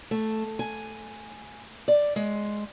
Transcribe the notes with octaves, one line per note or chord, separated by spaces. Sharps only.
A3
G#5
D5
G#3